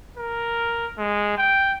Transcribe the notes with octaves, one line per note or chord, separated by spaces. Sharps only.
A#4
G#3
G5